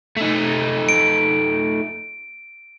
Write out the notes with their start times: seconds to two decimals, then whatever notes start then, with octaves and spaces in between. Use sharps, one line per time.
0.17 A3 D#4
0.89 D7